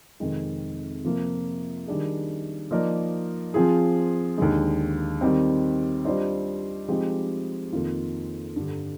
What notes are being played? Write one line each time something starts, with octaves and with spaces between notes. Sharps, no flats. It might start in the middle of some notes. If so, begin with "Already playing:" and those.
F2 C3 D#3 G#3 C4
C3 F3 A#3 F4
D#3 G3 D4 G#4
F3 A#3 D#4 A#4 D5
F3 C4 F4 G#4
D#2 D3 G#3
D#3 G3 C4
G3 D4 F4 C5 D#5
F3 G#3 C4 D#4 G4
F2 D#3 A#3 F4
G2 D3 G3